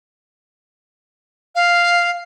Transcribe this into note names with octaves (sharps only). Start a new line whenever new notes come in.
F5